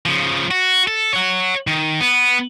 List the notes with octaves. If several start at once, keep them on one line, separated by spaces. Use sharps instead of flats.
C#3 F3
F#4
A4
C#5 F#5
D#3
B3